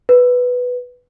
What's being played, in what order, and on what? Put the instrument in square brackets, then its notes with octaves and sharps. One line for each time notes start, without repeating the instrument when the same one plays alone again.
[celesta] B4